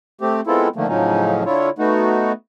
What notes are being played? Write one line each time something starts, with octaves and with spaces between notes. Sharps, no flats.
A3 C4 G4
G#3 B3 C4 E4 F4 A4
D3 D#3 F3 A3 A#3
A2 C#3 F3 F#3 C#4 D#4
D3 E4 F4 C#5
A3 B3 D#4 F#4